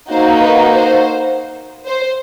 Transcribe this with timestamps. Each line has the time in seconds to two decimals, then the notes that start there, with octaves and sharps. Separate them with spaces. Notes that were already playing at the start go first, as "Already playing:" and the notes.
0.12 A#3 D#4 F#4 C5
0.41 B4
0.70 C5
1.88 C5